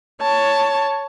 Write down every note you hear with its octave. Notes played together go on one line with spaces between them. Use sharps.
C#5 A5